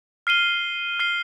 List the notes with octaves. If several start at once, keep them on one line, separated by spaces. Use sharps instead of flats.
F6 C7 D#7 G7
F6 C7 G7